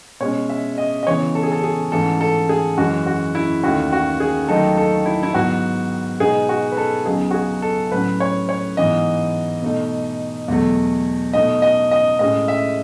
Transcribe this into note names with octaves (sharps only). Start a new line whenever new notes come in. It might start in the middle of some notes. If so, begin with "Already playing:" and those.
B2 G#3 C#4 C#5
E5
D#5
D#5
C#3 E3 B3 C#5
A4
G#4
A4
G#4
G#2 E3 A3 C#4 A4
A4
G#4
F#2 E3 G#3 C#4 F#4
F#4
E4
D#2 D#3 A3 C#4 F#4
F#4
G#4
D#2 D#3 F#3 A3 D#4 A4
A4
E4
E4
G#2 F#3 B3 F#4
B2 G#3 B3 D#4 G#4
F#4
B4
A4
C#2 C#3 F#3 B3 D#4 G#4
F#4
G#4
A4
A2 F#3 C#4 B4
C#5
C#5
G#2 E3 B3 D#5
B2 A3 D#4
E2 B2 F#3 A3
B2 A3 D#4 D#5
D#5
D#5
A2 G#3 C#4 D#5
E5